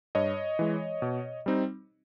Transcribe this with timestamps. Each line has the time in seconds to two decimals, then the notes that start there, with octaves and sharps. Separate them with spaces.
0.15 G2 C#5 D#5
0.59 E3 G#3
1.02 B2
1.46 G3 C4 D#4